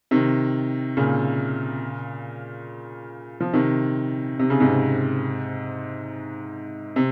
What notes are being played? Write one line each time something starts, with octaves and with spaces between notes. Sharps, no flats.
C3 D#3
A#2 C#3
F3
C3 D#3
C3
C#3
G#2 C3
C3